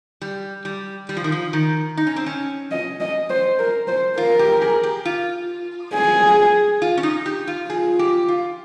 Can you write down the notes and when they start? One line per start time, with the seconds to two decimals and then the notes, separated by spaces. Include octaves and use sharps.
0.22 G3
0.65 G3
1.09 G3
1.17 F3
1.24 D#3
1.32 F3
1.53 D#3
1.97 D#4
2.07 C#4
2.16 C4
2.26 C#4
2.71 D#5
3.00 D#5
3.30 C5
3.59 A#4
3.88 C5
4.18 F4 A#4
4.39 G4
4.62 G#4
4.83 G4
5.05 F4
5.94 G#4
6.82 F4
6.97 C#4
7.03 D#4
7.26 G4
7.47 F4
7.70 F4 G#4
7.99 G4
8.28 F4